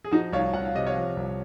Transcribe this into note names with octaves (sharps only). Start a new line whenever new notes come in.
G#4
F3 D#4 F#4
C2 C#5 F5
C2 F#5
F5
C3 D#5
C#5 F5
F3
C2